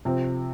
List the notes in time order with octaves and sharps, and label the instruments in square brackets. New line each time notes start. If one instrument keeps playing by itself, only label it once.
[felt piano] C3 F3 C4